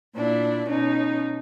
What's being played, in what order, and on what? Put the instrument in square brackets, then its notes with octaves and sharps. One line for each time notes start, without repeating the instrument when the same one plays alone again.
[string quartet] A#2 D4 E4
B2 C#4 D#4